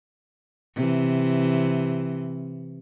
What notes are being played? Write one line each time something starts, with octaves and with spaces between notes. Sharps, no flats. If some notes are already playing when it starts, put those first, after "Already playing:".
C3 E3